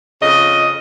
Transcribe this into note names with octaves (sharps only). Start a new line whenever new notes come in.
F2 C#3 D#5